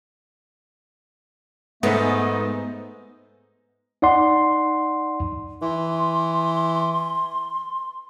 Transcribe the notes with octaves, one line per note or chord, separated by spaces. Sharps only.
G#2 A3 B3 D#4 C5
D#4 D5 F#5 C6
E3 C6